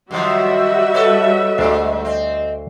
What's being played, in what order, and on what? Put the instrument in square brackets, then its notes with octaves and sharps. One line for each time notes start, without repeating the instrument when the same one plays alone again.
[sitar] F#2 D#3 F3 [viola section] G3 F#4 E5 [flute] D#5
[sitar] A4 B4 C#5
[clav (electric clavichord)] D2 D4 C5 [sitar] G#2
[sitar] C4 [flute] D#5